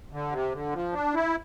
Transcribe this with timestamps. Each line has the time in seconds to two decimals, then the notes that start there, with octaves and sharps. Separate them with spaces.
0.12 D3
0.32 C3
0.52 D3
0.73 F3
0.93 D4
1.14 E4